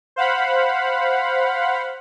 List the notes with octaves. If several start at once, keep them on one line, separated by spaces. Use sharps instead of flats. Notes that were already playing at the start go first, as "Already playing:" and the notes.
C5 F5 F#5 B5